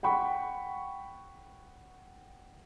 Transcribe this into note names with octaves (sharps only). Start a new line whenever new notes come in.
F#5 G5 B5 C#6